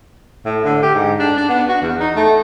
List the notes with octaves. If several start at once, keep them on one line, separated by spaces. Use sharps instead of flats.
A2
D3
G4
G#2
D4
D4
B3
F#4
E2
D#4
A3